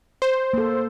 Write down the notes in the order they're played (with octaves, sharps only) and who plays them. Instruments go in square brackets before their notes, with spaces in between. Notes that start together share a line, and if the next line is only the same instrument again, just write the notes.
[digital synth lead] C5
[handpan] A#3 A4